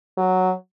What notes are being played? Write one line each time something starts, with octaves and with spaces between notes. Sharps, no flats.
F#3